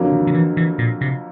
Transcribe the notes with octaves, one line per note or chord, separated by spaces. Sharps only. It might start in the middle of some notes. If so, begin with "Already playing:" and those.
Already playing: F2 D3 F#3 A#3
D#3
D#3
E3
E3
A#2
C3